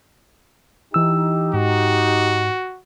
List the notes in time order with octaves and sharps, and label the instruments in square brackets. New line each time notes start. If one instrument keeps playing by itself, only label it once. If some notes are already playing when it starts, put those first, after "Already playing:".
[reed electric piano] E3 E6 [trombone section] D#4 G4
[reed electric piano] G#2 [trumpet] F#4